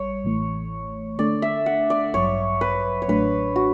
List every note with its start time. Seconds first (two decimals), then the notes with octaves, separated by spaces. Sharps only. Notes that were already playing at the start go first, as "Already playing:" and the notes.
Already playing: A1 G3 C#5
0.24 A1 A2 E3 A3
1.18 D3 A3 D4 A4 D5
1.42 E5
1.66 F#5
1.90 D5
2.13 A1 G2 F#3 C#5
2.61 B4
3.02 C#5
3.08 A1 A2 F#3 A3 D4 B4
3.56 F#4